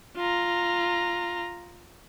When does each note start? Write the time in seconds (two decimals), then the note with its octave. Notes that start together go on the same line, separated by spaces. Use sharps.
0.17 F4 A#5